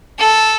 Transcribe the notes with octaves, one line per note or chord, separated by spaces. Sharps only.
A4